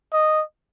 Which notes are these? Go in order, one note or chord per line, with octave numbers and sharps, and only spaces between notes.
D#5